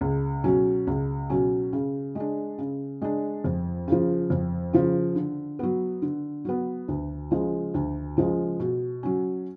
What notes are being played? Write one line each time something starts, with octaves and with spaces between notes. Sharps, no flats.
C#2
B2 F#3 C#4
C#2
B2 F#3 C#4
C#3
G#3 D4
C#3
G#3 D4
F2
C#3 F3
F2
C#3 F3
D3
F#3 B3
D3
F#3 B3
D2
C#3 F3 G#3
D2
C#3 F3 G#3
B2
F#3 C#4